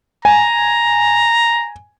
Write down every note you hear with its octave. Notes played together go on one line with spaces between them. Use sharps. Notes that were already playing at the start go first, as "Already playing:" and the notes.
G#5 A#5